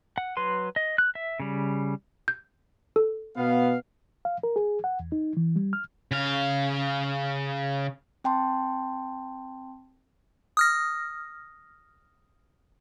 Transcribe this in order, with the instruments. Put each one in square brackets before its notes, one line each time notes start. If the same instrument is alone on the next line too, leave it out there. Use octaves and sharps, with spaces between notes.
[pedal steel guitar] F#5
F#3 B4 C6
D#5
F#6
E5
C#3 G3
[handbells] G6
A4
[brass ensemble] B2 B3 F5
[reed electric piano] F5
A#4
G#4
F#5
E2
D#4
E3
G3
F6
[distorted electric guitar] C#3 F5
[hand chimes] C4 G5 A5 C6
[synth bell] D#6 F6 A#6